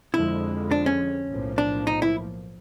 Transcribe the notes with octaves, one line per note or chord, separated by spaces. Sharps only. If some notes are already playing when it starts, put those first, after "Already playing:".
F2 D3 F3 G#3 E4
D4
C#4
B1 A2 F3 A#3
D4
D#4
E4